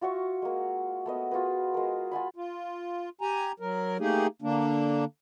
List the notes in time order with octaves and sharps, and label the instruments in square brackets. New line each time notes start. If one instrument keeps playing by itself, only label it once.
[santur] F4 F#4 E5 C#6
G#3 A#3
A3 B3 D#5
F4 F#4 G#4 B4
G#3 A#4
F4 F#4 G#5 B5
[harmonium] F4
G4 G#5 A#5
F#3 A#4
A3 A#3 D#4 G4 G#4
D3 A#3 D4